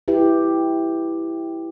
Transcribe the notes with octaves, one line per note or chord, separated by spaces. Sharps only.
E4 G4 B4